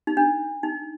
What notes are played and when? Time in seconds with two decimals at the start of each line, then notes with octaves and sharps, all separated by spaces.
0.07 D#4
0.17 D4
0.63 D#4